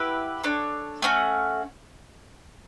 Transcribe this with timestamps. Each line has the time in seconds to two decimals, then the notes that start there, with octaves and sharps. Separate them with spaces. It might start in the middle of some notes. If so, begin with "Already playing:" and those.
Already playing: E4 G4 B4 F#5
0.43 D4 A4 C#5
1.02 A3 C#4 F#4